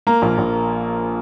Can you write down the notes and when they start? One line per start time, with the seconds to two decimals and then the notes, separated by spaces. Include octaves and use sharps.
0.07 A#3 A#5
0.22 A#1
0.38 A#1